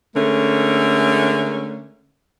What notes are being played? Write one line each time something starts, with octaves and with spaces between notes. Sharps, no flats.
D3 G#3 A3 C#4 A#4